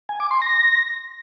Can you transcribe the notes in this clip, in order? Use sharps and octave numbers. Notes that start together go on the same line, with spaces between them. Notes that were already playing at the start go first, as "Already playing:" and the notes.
G#5
D6
C6
A#6